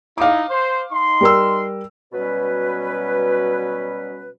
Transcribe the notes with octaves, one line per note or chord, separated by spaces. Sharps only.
D#4 E4 F5 D6
C5
D#4 C6
G3 A#4 E6
B2 F#3 G3 C#4 B4